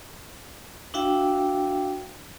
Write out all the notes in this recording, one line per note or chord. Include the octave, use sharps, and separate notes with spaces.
D4 E4 F#4 E5 F5 G5